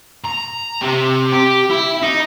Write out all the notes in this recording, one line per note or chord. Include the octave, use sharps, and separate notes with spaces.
A#5
C3
G4
E4
D#4